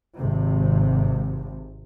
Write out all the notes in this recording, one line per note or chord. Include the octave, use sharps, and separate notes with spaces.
G#1 C3